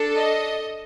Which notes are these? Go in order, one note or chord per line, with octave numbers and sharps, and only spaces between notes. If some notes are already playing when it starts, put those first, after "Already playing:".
Already playing: D4 A4
D#5